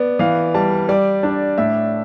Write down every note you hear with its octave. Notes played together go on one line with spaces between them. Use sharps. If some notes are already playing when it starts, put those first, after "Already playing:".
Already playing: B3 D5
E3 F5
G3 A5
G3 D5
D4
A2 E5